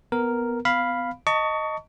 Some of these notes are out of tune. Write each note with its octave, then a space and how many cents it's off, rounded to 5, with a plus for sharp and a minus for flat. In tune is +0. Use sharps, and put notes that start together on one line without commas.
B3 +0 A#4 +0
B3 +35 F5 +0 B5 +0
D#5 +0 A5 +30 C#6 +25